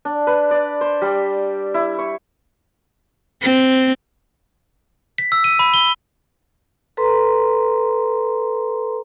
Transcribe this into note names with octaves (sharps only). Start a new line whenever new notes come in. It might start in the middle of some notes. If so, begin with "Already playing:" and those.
D4
B4
D5
C5
G3
E4
C#6
C4
B6
E6
D#7
B5
G7
A4 B4 A#5 C6